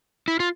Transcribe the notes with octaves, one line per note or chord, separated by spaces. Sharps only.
E4
F4